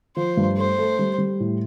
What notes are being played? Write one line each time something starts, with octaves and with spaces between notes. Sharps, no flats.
F3 C5
G2
A3 C5
A3
G3
G3
A2